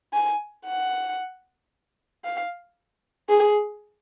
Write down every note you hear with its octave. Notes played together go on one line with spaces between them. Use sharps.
G#5
F#5
F5
G#4